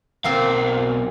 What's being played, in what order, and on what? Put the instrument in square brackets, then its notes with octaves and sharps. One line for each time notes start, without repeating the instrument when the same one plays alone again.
[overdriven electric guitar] B1 F5 [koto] A#3 C4 F4